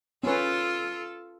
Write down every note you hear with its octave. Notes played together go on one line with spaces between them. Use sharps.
C#4 F4 A4 B4